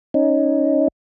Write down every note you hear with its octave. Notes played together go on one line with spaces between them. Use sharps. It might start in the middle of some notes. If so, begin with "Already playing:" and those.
C#4 D#4